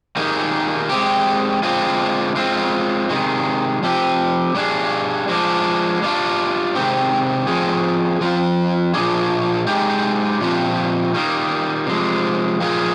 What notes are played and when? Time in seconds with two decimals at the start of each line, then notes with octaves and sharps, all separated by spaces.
0.16 D#3 G3 A#3 D#4 G#4
0.89 G#3 C4 G4
1.63 D3 G#3 C4 F4
2.36 G#3 C4 F4
3.09 C3 D#3 G#3
3.83 F3 C4 G4
4.55 G3 D4 G#4
5.28 F3 G#3 D4
6.02 G3 D4 F4
6.75 C3 D#3 G#3 C4 G4
7.47 F3 C4 F4 G#4
8.21 F3 C4 F4
8.94 A#2 F3 G#3 D4 G#4
9.67 G#3 D#4 G4
10.40 A#2 F3 C4 G4
11.14 D#3 G3 A#3
11.86 C3 F3 G#3
12.60 A#2 F3 A#3 F4 G#4